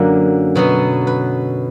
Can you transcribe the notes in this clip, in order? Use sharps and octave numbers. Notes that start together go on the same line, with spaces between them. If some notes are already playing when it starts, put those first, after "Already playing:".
Already playing: F#2 D3 F#3 A#3 A#4
B2 F#3 B3
B4